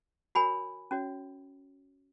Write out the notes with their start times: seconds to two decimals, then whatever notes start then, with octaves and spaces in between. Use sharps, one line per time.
0.35 F#4 A#4 C#5 G#5 B5
0.91 C#4 F#4 C#5